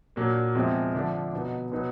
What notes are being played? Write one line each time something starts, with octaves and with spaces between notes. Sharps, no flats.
A#2 F#3 A#3 D4
E2 C3 F3 G#3 C4
D3 F3 A3 D4
B2 F#3 B3 D#4
B2 F#3 B3 D#4